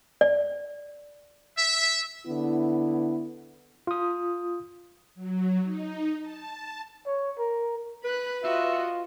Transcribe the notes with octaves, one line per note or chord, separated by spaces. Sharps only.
D5
E5
D3 B3 E4
F4 D#6
F#3
D#4
A5
C#5
A#4
B4 B5 F#6
F4 F#4 D#5 E5